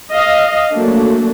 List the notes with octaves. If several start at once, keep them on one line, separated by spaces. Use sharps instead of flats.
D#5 F5
F#3 A3 A#3 D4